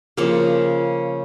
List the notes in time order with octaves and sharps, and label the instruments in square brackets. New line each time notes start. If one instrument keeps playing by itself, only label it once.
[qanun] C#3 F3 A#3